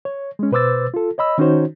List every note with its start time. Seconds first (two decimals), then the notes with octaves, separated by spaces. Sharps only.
0.05 C#5
0.39 G#3 C#4
0.52 B2 B4 C5 D6 E6 A6
0.94 F4 A4
1.18 C#5 D#5 B5 E6
1.38 D#3 C#4 D#4 F#4 C5 C#5